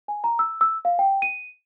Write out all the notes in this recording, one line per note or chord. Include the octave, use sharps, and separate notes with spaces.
G#5
A#5
E6
E6
F5
G5
D#7